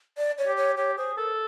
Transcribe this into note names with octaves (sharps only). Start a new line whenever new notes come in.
D5
C#5
G4
C#5
G4 C#5
G#4 C5
A4 A#4